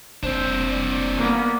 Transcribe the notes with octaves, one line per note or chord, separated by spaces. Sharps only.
F1 C4 D4 C5
D5
A#3 B3